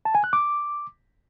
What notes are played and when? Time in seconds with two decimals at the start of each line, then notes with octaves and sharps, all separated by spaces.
0.05 A5
0.15 G#5
0.24 F#6
0.33 D6